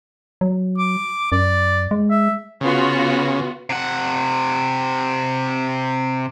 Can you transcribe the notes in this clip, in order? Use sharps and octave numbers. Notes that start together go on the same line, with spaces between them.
F#3
D6
F#2 D5
G#3
E5
C#3 B3 F4 F#4
C3 F#5